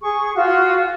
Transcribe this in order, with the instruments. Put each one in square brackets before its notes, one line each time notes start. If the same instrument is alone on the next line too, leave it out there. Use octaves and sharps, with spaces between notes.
[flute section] G#4 C#6
F4 F#4